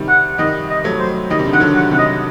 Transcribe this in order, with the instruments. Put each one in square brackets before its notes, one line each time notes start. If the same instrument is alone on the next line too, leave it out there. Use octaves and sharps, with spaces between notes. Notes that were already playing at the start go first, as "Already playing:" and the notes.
Already playing: [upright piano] C3 D#3 G3
[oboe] F#5
[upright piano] D#3 G3 [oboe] D#5
[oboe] D#5
[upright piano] F#3 A3
[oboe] C5
[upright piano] D#3 G3 [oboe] D#5
[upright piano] C3
D3
[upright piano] D#3 [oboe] F#5
[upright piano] D3 F#3
[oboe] F#5
[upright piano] C3 D#3 [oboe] F#5
[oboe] D#5